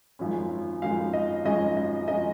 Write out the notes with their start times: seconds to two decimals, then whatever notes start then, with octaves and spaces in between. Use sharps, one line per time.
0.19 G#1 F#2 F3 G#3 C#4
0.82 G#1 F#2 F3 G#3 C#4 F5
1.13 D#5
1.45 G#1 F#2 F3 G#3 C#4 D#5
1.77 D#5
2.08 F3 G#3 C#4 D#5